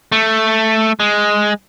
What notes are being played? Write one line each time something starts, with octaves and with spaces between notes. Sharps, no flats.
A3
G#3